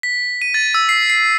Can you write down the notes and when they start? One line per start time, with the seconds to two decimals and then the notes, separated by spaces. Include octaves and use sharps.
0.03 B6
0.42 D#7
0.54 A6
0.74 E6
0.89 C7
1.10 C7